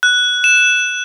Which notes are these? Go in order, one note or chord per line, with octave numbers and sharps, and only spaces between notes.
F#6
E7